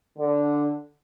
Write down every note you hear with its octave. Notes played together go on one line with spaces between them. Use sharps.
D3